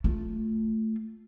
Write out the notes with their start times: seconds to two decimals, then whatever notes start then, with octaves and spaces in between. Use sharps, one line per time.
0.04 A3 F4